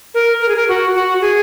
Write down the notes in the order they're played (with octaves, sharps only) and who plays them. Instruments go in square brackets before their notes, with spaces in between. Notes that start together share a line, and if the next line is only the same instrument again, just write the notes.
[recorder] A#4
A#4
G#4
A#4
F#4
F#4
G#4